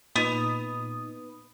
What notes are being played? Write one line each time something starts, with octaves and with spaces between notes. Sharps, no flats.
A#2 B3 D#4 D#6